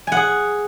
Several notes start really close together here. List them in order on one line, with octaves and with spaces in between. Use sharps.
G#5 F#5 G#4